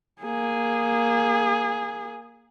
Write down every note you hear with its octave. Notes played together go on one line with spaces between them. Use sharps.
A#3 G#4